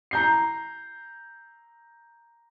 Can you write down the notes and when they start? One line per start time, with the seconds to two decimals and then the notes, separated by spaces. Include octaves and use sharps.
0.11 A#5 G6 C7